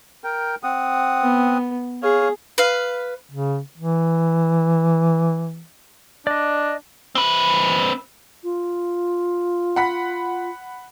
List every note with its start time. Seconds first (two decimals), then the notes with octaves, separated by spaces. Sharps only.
0.24 A#4 G5
0.63 C4 F#5 D#6
1.22 B3
2.03 G#4 C#5 F5
2.58 B4 F5
3.31 C#3
3.77 E3
6.27 D4 D5 D#5
7.15 C4 B4
8.44 F4
9.76 F#5 B5 B6